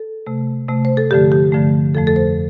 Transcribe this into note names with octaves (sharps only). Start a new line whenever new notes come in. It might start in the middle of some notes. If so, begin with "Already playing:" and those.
Already playing: A4
C3 A3
C3 A3
C5
A4
G2 D3 F3 A3 G4
G4
G2 D3 F3 A3
F2 F3 A3 A4
A4
C5